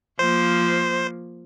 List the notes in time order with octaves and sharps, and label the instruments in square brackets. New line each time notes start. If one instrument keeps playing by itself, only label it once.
[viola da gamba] F3 A#3 [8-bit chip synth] C5